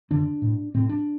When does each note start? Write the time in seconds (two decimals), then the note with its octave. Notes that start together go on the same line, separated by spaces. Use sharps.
0.11 F#2 D3 D4
0.42 A2
0.74 A2 C4
0.89 D4